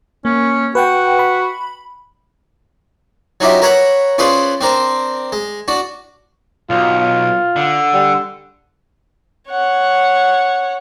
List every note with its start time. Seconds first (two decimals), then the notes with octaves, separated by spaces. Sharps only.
0.25 A#3 C#4
0.75 F#4 B4 F#5 G5
1.19 B5
3.40 F#3 C#4 D#4 F4 G4 E5
3.62 A#4 B4 C#5 E5 F#5 A#5
4.18 C#4 F4 G#4 B4 C5 D5
4.61 C4 D4 A#4 C5
5.32 G#3
5.68 D4 F#4
6.70 B1 F4
7.56 D3
7.94 G3
9.49 C#5 F#5